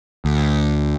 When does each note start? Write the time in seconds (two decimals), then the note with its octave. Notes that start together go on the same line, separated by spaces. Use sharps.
0.25 D2